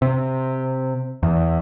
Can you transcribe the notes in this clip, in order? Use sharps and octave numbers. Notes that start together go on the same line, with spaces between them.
C3
E2